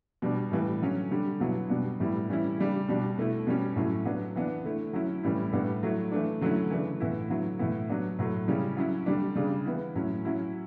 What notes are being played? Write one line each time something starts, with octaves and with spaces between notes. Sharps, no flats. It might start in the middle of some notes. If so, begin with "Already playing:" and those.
B2 G3 D4
A2 E3 G3
D3 F#3 C#4
D3 G3 D4
B2 F#3 B3 E4
B2 G3 B3 D4
A2 G3 B3 E4
E3 G3 C#4 E4
C#3 G3 D4
B2 G3 D4
B2 A3 E4
B2 G3 C#4
A2 F#3 C#4 E4
F#3 B3 D4
E3 B3 D4
D3 A3 E4
F#3 C#4 E4
A2 E3 G3 C#4 E4
A2 G3 B3 D4
F#3 A3 E4
E3 A3 D4
D3 F#3 A3 C#4 E4
C#3 E3 A3 D4
A2 E3 B3 E4
D3 F#3 B3 E4
A2 E3 B3 E4
F#3 B3 D4
A2 F#3 A3
C#3 G3 C#4 E4
F#3 C#4 E4
D3 G3 D4
C#3 G3 D4
E3 B3 E4
A2 F#3 C#4 E4
F#3 C#4 E4